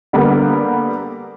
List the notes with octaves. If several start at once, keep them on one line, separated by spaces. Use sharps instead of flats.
D3 G3 A#3 B3 A4 A#4